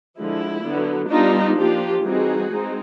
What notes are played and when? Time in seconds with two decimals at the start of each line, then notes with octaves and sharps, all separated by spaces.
0.17 D3 F3 G#3 E4
0.63 D3 F#3 B3
1.09 G3 B3 D4 D#4 F4
1.56 F3 A#3 D4 F4 G4
2.03 E3 G3 C4 D#4 F#4 G#4
2.49 G#3 C4 D#4